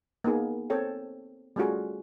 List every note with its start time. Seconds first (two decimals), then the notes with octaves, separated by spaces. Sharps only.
0.24 A#3 B3 D#4 G#4
0.70 C4 A4 C#5 G5
1.56 G3 A3 C#4 F4 F#4 G#4